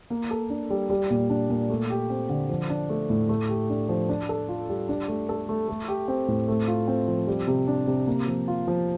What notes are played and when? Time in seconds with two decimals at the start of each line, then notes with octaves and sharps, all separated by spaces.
0.10 A#3
0.31 A4
0.50 D4
0.70 G3
0.90 G3
1.10 A#2
1.30 D4
1.50 A#2
1.70 A3
1.90 G4
2.10 C4
2.29 D3
2.49 F3
2.70 D4
2.89 A3
3.10 A2
3.29 A3
3.49 G4
3.70 D4
3.89 F3
4.09 D4
4.29 A4
4.49 F4
4.69 G3
4.89 D4
5.08 A3
5.29 A4
5.49 A3
5.68 A3
5.88 G4
6.08 C4
6.28 A2
6.48 A3
6.68 F4
6.88 C4
7.08 F3
7.27 G3
7.48 C3
7.68 D4
7.87 C3
8.07 A#3
8.28 F3
8.48 F4
8.68 F3